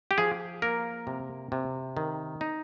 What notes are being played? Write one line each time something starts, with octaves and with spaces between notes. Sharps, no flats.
G4
F3 G#4
A#3 A#4
C3
C3
D#3
D#4